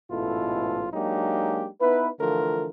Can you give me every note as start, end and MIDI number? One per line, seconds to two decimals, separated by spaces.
0.10 0.87 33
0.10 0.87 44
0.10 0.87 47
0.10 0.87 64
0.10 0.87 65
0.10 0.87 69
0.93 1.67 54
0.93 1.67 56
0.93 1.67 58
0.93 1.67 62
0.93 1.67 63
0.93 1.67 67
1.80 2.09 59
1.80 2.09 63
1.80 2.09 64
1.80 2.09 71
2.20 2.69 50
2.20 2.69 52
2.20 2.69 53
2.20 2.69 57
2.20 2.69 65
2.20 2.69 70